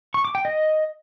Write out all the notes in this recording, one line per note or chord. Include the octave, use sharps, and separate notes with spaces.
C#6
D6
G5
D#5